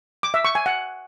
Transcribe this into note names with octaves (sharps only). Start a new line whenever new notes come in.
D6
E5
C#6
G#5
F#5